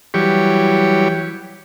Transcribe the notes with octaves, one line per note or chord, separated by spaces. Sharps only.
E3 F#3 G3 G4 C#5